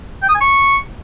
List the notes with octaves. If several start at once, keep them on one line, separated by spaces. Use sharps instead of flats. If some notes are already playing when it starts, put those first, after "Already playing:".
G5
D#6
G#5
C#6